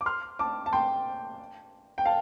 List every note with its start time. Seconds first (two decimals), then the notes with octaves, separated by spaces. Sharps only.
0.01 D6
0.06 C6 F6
0.39 A5 D6
0.66 A5
0.73 G5 C6
1.98 G5
2.05 F5 A5